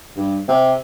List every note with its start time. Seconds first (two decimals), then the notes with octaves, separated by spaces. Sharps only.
0.17 G2
0.48 C3